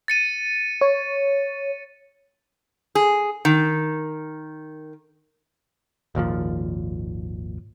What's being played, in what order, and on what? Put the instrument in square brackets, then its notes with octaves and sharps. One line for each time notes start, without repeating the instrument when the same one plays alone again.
[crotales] A6 C#7 D#7
[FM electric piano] C#5
[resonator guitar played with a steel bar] G#4
D#3
[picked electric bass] G#1 D#2 A#2 F3